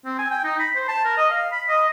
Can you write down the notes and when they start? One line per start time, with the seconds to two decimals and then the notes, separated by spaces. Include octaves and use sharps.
0.06 C4
0.19 G#5
0.31 G5
0.44 D#4
0.60 B5
0.76 C5
0.89 A5
1.05 A#4
1.18 D#5
1.31 F5
1.52 B5
1.69 D#5